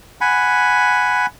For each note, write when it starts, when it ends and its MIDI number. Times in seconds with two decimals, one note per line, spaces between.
0.21 1.26 78
0.21 1.26 80
0.21 1.26 83